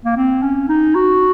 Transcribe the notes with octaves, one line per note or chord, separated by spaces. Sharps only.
A#3
C4
C#4
D#4
F#4